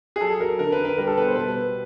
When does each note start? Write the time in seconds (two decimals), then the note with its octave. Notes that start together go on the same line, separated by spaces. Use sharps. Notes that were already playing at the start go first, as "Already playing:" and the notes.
0.16 G#4
0.21 F#3 A4
0.40 F#3 A#4
0.59 D3 A#4
0.72 B4
0.79 D3
0.85 B4
0.98 G3 A#4
1.07 A4
1.17 B2 B4
1.27 C5
1.36 G3 B4
1.55 B2